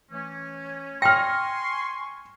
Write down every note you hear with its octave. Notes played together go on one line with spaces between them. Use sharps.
E3 A3 C#4
G5 G#5 C6 C#6 F6 A#6